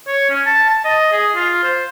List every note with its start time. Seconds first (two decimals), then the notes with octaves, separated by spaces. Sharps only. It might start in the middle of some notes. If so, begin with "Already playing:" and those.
0.07 C#5
0.30 C#4
0.46 A5
0.70 A5
0.85 D#5
1.12 G#4
1.36 F4
1.63 C5